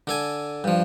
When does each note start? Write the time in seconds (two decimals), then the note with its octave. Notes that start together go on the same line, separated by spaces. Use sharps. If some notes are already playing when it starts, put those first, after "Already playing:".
0.07 D3 A4 G#5
0.64 G2 F3